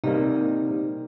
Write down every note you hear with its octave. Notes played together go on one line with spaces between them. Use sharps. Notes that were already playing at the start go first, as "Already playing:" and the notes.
C3 G3 A#3 D#4